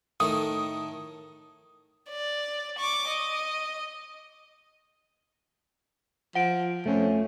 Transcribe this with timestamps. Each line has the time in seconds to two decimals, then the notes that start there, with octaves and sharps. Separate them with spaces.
0.20 A2 D#3 A3 D#6
2.10 D5
2.78 C#6 D6
3.08 D#5
6.35 F3 F#5 D7
6.86 F2 A3 C#4